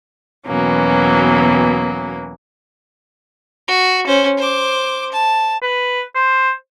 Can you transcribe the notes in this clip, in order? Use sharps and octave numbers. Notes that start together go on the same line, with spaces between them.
E2 B2 E3 F#3 A#3 C#4
F#4
C#4 C5
C5 D6
A5
B4
C5